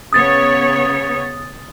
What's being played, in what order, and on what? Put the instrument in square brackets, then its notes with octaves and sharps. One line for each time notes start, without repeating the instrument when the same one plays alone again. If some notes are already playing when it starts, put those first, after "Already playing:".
[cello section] C#3 B3 C#5 [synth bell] D#6 A6